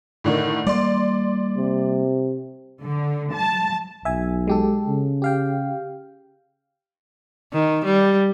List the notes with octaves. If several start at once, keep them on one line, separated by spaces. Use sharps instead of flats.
A2 D3 D#3
G3 A#3 D5 C6
C3
D3
A5
B1 E5 G#5
G#3 G4 A4
C#3
G4 F5 G5
D#3
G3